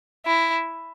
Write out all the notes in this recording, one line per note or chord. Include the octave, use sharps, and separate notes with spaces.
E4